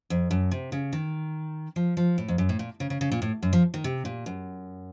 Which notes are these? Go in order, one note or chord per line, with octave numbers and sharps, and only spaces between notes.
F2
F#2
C3
C#3
D#3
F3
F3
A2
F2
F#2
A2
A#2
C#3
C#3
C#3
A#2
A2
F#2
F3
D#3
C3
A#2
F#2